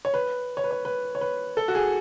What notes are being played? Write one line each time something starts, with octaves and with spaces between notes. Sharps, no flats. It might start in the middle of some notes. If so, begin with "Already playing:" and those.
C#5
B4
C#5
B4
C#5
B4
C#5
B4
A4
F#4
G#4